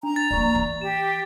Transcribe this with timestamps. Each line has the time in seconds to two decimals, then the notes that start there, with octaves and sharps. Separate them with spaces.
0.03 D4 A#5
0.16 A6
0.31 F3 A#3 D5 C#6
0.55 E3
0.81 G4 E7